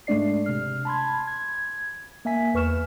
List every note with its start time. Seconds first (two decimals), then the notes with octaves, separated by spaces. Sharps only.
0.07 G#2 G#3 A3 D4 D5 C7
0.46 C3 F6
0.85 A5 B5 C6 G#6
1.27 G#6
2.25 A#3 E5 G#5 B6
2.54 E2 B4 C#6 F6 E7